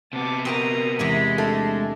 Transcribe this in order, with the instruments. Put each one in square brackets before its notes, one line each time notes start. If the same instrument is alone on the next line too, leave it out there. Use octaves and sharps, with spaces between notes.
[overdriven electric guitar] C3 B3 [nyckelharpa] A5 D6
[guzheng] C4 F#4 A#4 [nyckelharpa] A#5 D#6
[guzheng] E2 C3 G#5 [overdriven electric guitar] G#3 [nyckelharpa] B5
[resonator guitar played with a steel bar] A3 [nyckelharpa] D4